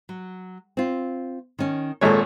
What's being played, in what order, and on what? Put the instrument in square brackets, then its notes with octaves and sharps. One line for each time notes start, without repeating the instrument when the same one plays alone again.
[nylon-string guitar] F#3
C4 F4
D#3 C#4
[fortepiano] G#1 A#2 C#5 [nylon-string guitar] G#3 A4